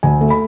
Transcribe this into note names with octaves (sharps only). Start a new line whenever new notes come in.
D2 G#5
A3
B5